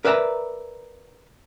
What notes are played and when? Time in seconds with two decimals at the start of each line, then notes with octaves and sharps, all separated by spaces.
0.05 A#4 B4 D5 E5 A5 A#5